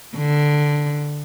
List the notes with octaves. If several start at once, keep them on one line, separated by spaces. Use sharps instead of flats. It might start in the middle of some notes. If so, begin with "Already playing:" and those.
D3